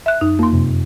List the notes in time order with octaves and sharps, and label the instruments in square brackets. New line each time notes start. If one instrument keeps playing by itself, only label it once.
[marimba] E5 F#6
[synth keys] F#2 [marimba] D#4
[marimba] F2 C6 [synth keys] A#3
[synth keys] F#2 C3